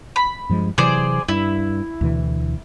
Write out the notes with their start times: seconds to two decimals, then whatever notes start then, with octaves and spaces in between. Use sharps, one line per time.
0.16 B5
0.49 G2 F3 G#3
0.78 C3 E3 F#3 G#4 C5 D5
1.28 G2 E4
2.01 D2 B2 E3